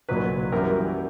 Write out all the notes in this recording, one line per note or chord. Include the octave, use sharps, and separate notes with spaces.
B1 A#2 F#3 B4
F#2 E3 G3 A#4